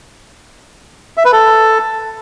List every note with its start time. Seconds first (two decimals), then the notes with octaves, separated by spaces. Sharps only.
1.17 E5
1.25 B4
1.33 A4